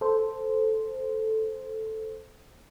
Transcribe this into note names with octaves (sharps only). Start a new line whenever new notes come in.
A4 C5